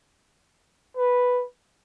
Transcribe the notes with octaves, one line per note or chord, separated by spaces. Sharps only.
B4